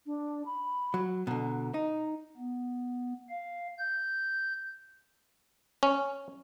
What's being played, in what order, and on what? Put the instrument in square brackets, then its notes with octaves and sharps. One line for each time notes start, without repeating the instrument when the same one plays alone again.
[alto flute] D4
B5
[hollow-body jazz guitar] F#3
[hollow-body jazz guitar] B2 D3 [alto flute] A#5
[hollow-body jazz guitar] D#4 [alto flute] A#5
[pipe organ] B3
F5
G6
[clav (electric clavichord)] C#4